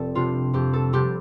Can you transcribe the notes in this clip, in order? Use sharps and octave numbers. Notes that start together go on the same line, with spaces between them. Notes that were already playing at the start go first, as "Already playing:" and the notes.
Already playing: F1 C4 A4 D5
C3 G3 D4 F4
F2 G4
A4
C3 G3 C4 G4